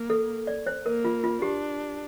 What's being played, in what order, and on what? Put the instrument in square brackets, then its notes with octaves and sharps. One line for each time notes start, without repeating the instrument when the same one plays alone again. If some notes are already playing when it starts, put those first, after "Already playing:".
Already playing: [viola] A#3
[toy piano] A4
D5
C5
[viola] A#3 [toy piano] A#4
[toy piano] F4
F4
[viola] D4 [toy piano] G4